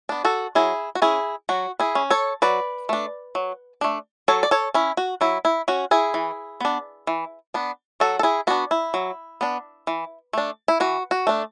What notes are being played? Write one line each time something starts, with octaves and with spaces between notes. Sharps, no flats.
B3 D4
F#4 A4
F#3 E4 G#4
F#4
C#4 E4 G#4
F#3 F#4
E4 G#4
C#4
A4 C#5
F#3 B4 D5
A3 D4
F#3
A3 D4
F#3 A4 C#5
D5
A4 C#5
C#4 E4
F#4
F#3 E4
E4
C#4 F#4
E4 G#4
E3
B3 D4
E3
B3 D4
F#3 F#4 A4
A4
E4 G#4
B3 D4 F#4
E4
F#3
B3 D4
E3
A3 D4
E4
E3 F#4
F#4
A3 D4